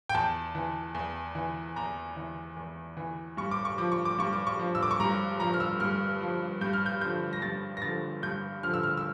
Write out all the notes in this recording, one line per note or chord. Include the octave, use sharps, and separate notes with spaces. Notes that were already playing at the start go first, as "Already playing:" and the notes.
G5
E2 A5
E3
E2
E3
E2 A#5
E3
E2
E3
G2 C#6
D6
C#6
F3 D6
C#6
D6
G2 C#6
D6
C#6
F3
E6
D6
C#6
G2 A#5
F3 A#5
F6
E6
G2 F6
F3
G2 G6
F6
G6
D3 F3 G6
A#6
G2 A6
A#6
D3 F3 A6
G2 G6
D3 F3 F6
E6
F6
E6